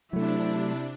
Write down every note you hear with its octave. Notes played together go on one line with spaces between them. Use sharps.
C3 F#3 A3 D4 E4